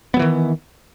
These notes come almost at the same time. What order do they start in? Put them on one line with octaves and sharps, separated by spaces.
B3 F#3 E3 D#3